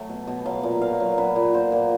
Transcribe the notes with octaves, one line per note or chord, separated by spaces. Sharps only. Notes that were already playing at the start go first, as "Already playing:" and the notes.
Already playing: F#3 A3
B2
B2
F#3 F5
A#2
A#2 F5
F#3
F#3 B4
A#2
A#2 C5
A#2